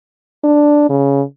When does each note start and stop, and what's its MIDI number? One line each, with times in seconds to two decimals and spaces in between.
0.44 0.89 62
0.89 1.22 49